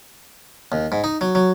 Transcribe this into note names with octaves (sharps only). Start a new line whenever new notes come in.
D#2
G#2
D#4
F#3
F#3